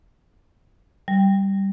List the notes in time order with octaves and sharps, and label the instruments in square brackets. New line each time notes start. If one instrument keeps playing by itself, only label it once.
[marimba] G3